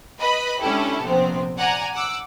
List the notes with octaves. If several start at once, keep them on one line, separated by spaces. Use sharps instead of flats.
B4 D#5 B5
G#3 C#4 D4 E4 G4 A4
A#1 C3 B3 C4
D5 F#5 G#5 A#5
F#5 D6 E6